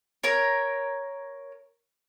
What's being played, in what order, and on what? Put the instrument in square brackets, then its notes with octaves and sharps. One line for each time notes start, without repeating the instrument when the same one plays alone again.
[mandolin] A#4 C#5